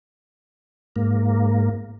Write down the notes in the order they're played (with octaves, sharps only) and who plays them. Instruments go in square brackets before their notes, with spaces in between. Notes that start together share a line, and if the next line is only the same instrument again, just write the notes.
[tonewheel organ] G#2 A#3